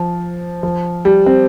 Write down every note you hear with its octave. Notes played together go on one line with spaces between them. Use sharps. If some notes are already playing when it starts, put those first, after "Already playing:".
Already playing: F3
F3
G3
C4